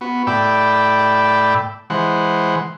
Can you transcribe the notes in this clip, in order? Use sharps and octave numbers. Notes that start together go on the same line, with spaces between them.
B3 F#4
A2 D5 G5 B5 E6
E3 G#3 C5 F#5